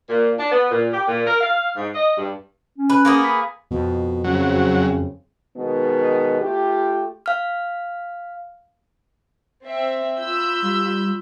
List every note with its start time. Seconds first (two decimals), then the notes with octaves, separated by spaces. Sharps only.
0.09 A#2
0.38 D4
0.51 B3
0.70 A#2
0.92 G4
1.07 A#2
1.26 A#4
1.40 F5
1.76 G#2
1.94 D#5
2.17 G2
2.78 C#4
2.90 B4
3.05 A#3 B3 G#4
3.24 B5
3.71 F2 B2
4.24 F#2 C#3 F#3 C4
5.57 B2 D#3 G#3 B3
6.41 A3 F4 G4
7.26 F5 F6
9.64 C4 E5
10.18 F4 B5 E6 G6
10.62 G3